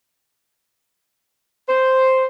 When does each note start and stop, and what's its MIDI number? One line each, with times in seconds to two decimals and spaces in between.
1.69 2.26 72